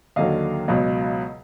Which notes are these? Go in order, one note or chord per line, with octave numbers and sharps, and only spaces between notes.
D#2 D3 F#3 D#5 F5
C#2 B2 F#3